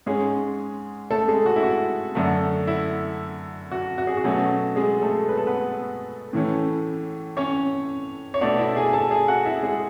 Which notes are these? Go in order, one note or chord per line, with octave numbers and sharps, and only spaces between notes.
G#2 G#3 C#4 G#4
A3 A4
G#3 G#4
F#4
E4
F#4
F#2 D3 A3
E4
F#4
F#4
G#4
F#4
B2 F#3 A3 C#4
G#3 G#4
A3 A4
B4
A4
B3 B4
A2 E3 A3 C#4
C#4 C#5
C#5
B2 A3 D4 D5
E4 E5
G#4 G#5
G#5
A4 A5
G#4 G#5
F#4 F#5
E4 E5
G#3 G#4